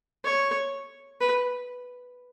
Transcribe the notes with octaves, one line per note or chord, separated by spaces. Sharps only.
C#5
B4